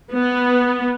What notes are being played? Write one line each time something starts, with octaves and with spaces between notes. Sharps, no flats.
B3